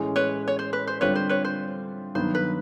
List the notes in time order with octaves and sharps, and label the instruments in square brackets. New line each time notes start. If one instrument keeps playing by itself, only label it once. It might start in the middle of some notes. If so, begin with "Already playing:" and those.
Already playing: [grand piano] A2 E3 G#3 C#4
[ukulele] B4 C#5
C#5
C5
B4
C5
[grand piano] D3 G3 C4 F4 [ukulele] B4 C#5
[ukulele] C5
B4 C#5
C5
[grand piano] G2 D#3 F#3 B3 [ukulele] C5
[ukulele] B4